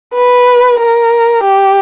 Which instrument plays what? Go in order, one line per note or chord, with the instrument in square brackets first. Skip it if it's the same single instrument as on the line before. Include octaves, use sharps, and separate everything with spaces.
[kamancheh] B4
A#4
G4